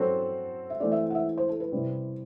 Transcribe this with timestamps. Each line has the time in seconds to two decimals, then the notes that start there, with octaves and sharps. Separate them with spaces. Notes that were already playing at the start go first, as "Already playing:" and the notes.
Already playing: F#3 C4 F#4 A4 C5
0.70 E5
0.80 E3 A3 C4 D5
0.92 E5
1.10 F#5
1.15 E5
1.38 C5
1.49 A4
1.60 B4
1.72 C3 G3 C4 E4